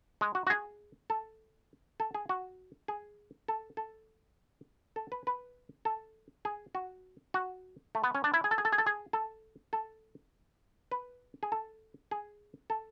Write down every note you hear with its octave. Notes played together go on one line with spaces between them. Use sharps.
G#3
F#4
F#4
G#4
A4
A4
G#4
F#4
G#4
A4
A4
A4
B4
B4
A4
G#4
F#4
F#4
A3
B3
C#4
D4
E4
G#4
A4
G#4
A4
G#4
A4
G#4
A4
A4
B4
G#4
A4
G#4
A4